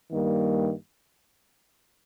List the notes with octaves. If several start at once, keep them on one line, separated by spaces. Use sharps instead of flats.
G2 D#3 G3 A#3